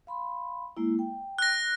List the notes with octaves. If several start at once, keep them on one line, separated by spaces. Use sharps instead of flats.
F5 B5 C6
G#3 A#3 E4
G5
F#6 A#6